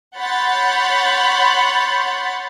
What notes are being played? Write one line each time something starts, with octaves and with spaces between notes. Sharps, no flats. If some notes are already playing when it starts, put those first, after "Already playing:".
C#5 F#5 B5 C6 G6 A6